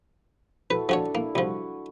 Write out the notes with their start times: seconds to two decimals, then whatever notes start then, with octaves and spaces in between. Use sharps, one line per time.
0.70 E4 F#4 A4 B4
0.89 F3 D4 F#4 A4 C#5
1.15 A#3 E4
1.35 C2 F3 F#4